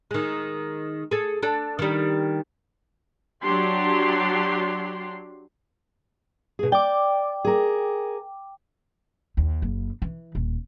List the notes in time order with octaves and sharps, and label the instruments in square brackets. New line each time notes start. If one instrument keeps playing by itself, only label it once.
[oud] D#3 G#3
G#4 A4
D4 A4
D#3 G3
[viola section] F#3 D4 G4 C6
[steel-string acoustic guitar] B2 G#4
[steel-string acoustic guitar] D5 [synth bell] G5 D6
[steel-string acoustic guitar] G#4 A#4
[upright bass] D#2
F#1
E3
D#1